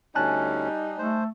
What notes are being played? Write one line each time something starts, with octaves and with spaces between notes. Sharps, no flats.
D2 G3 C#4 D#4 G#5 A5 F#6
A3 C5